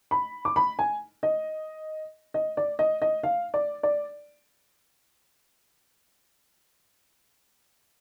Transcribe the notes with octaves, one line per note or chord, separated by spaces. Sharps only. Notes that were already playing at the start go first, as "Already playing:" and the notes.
B5
D6
B5
G#5
D#5
D#5
D5
D#5
D#5
F5
D5
D5